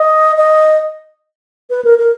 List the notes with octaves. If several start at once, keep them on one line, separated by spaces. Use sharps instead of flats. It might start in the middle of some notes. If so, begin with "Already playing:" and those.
Already playing: D#5
D#5
B4
A#4
A#4